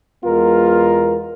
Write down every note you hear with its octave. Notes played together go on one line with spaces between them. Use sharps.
E2 G#3 B3 F4 A#4